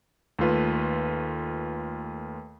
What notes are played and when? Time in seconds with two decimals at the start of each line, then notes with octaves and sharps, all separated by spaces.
0.39 D#2 A3 F4 B4